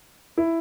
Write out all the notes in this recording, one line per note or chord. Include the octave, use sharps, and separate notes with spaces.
E4